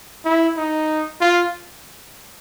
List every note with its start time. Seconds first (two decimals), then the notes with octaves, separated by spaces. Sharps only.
0.25 E4
0.57 D#4
1.21 F4